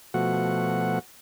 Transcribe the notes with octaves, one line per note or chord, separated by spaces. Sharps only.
B2 F3 A3 F#4 F#5